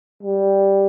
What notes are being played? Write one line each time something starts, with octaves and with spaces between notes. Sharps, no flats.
G3